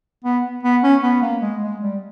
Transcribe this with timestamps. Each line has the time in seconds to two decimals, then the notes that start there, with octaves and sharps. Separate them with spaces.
0.24 B3
0.63 B3
0.83 C#4
1.03 B3
1.22 A#3
1.42 G#3
1.62 G#3
1.81 G3